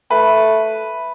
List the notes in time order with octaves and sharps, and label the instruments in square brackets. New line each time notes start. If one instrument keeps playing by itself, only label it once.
[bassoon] A3 [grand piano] B4